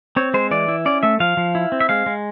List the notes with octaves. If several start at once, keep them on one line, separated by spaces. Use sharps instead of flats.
C4 C#5
G#3 C5
E3 D5
E4
C#4 D5
A3 E5
F3 F5
F3
E4
C4
E5
G#3 F5
G#3